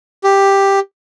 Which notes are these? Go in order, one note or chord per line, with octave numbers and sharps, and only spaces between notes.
G4